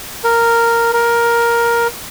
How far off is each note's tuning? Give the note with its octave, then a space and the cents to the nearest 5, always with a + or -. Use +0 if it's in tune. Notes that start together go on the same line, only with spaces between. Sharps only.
A#4 -5
A#4 +10